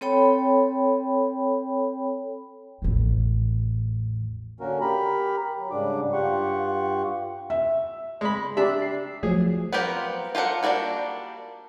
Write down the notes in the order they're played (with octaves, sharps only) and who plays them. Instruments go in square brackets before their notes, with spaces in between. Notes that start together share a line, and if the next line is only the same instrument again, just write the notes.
[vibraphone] C4 A4 C#5 G5 B5
[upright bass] A1 E2
[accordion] D3 A#3 C#4 F#4 A#4
G4 A#4 A#5 B5
F#3
G#2 C#3 G3 D4 D6
G2 F4 G4 F#5 C#6
[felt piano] E5
[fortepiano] G#3 B5
[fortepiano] D4 E5 [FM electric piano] G4
[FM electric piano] C7
[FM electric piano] F3 F#3 A3 [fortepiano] G#4
[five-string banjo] B3 C4 F4 G4 A#4
F4 G4 A4 A#4 F#5
G3 A#3 D4 E4 F#4